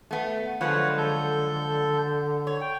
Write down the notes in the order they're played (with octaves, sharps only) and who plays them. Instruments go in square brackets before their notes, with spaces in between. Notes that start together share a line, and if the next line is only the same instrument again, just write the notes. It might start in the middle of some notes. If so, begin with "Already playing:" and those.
[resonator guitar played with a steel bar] A3 B3
[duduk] D3 [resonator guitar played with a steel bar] F3 F#3 G#3 [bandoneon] B4 C#5 F#5
[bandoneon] A4 G6
[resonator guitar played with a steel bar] C#5
[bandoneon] G5